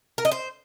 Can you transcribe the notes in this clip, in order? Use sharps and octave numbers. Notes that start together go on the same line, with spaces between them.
A#4
D#5
C5